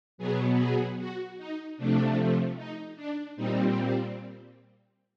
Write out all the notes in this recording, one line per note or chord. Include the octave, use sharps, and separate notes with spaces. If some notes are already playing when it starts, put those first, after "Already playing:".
B2 F#3 B3 G#4
G#4
F#4
D#4
C3 F3 A3 D4
D#4
D4
A#2 G3 C4 D#4